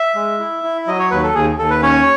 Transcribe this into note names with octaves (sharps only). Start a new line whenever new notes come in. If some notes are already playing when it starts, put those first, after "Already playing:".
Already playing: E5
G#3
E4
E4
F#3 D#5
C#5
D#2 B4
A4
D#2 G#4
D#2 A4
B4
C#4 C#5